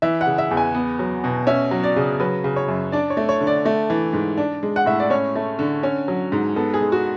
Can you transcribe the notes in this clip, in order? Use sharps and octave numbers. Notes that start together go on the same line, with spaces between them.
E3 E5
F#5
C#3
E5
E2
G#5
B3
F#3
B2
C#4 E5
F#3
D5
C#3
F#3 B4
C#3
C#5
F#2
D4 D5
C#5
A3
C#5
D3
D5
A3
E3
G#2
D4
G#3
F#5
A2 E5
D5
C#4 C#5
A3
D3
C#4
F#3
G#2
B3 A4
G#4
G#3
F#4